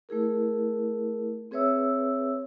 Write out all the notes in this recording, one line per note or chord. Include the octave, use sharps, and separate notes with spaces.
A3 E4 G#4 A#4
C4 G#4 B4 C#5 E5 E6